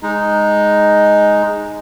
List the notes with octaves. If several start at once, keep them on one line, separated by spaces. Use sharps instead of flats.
G#3 D#4